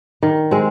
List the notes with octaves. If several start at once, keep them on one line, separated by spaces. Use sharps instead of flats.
D#3
G#3 C4